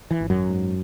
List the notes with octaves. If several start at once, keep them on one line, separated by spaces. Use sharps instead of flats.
E3
G#1
F#2 F#3
G#2